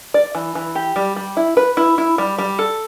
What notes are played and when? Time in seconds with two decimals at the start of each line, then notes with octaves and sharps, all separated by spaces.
0.14 D5
0.35 E3
0.55 E3
0.75 G4
0.96 G3
1.16 G3
1.37 E4
1.57 B4
1.77 E4
1.98 E4
2.18 G3
2.38 G3
2.59 A4